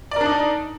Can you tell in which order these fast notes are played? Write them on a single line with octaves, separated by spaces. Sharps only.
D5 A#4 D4 D#4